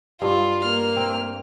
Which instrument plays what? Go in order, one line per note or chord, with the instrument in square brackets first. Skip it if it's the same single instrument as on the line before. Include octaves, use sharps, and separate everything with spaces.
[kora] G2 [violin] F4
[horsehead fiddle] A#3 [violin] F6
[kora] C4